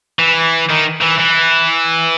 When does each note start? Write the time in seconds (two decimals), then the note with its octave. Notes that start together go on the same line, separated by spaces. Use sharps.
0.19 E3
0.70 D#3
1.02 E3
1.20 E3